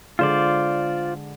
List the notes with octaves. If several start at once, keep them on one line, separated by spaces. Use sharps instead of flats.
D3 G#3 D4 F4 C5 D5